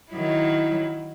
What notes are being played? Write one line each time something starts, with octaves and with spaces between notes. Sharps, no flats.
D#3 F#3 E4